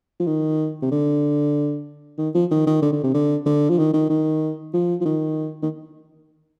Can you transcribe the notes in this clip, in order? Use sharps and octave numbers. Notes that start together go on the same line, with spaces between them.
F3
D#3
C3
D3
D#3
F3
D#3
D#3
D3
D3
C3
D3
D3
F3
D#3
D#3
D#3
F3
F3
D#3
D#3